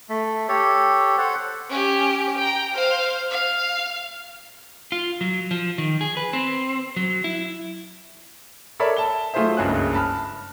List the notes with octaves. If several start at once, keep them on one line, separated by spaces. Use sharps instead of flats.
A3
G4 A4 C#5
A4 C5 C#5 F#5
C#4 G4
G5 A#5
C5 F5
F5
F4
F#3
F3
D#3
G#4
B4
C4
F#3
E4
A4 A#4 C#5 D5 E5 B5
A5 G7
F#3 A3 F4 G#4 C5 E5
F#1 C#2 G2 G#4 C#5 F#6
A5 B5 F6